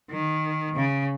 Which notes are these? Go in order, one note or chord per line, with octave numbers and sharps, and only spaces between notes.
D#3
C#3